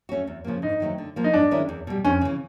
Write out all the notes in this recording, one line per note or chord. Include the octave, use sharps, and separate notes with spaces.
A3 C#4 F#4
E2
C#3 F3 A#3
G#2 D#4
D#3 F#3 A3 C4
D3
F3 A#3
D#4
G2 D4
D#3 G#3 C#4 E4
E2
B2 G3
F2 C#4
C#3 E3